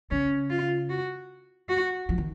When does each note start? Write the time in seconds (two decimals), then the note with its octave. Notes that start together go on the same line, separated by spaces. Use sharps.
0.11 C#3 C#4
0.50 F4
0.90 F#4
1.69 F#4
2.09 F3
2.18 D#3